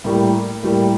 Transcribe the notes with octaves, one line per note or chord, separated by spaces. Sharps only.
A2 G3 A#3
A2 G3 A#3